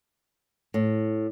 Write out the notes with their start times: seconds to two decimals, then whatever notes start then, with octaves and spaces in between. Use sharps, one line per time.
0.74 A2